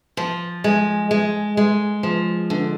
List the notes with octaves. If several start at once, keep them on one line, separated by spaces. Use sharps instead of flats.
F3
G#3
G#3
G#3
F3
D3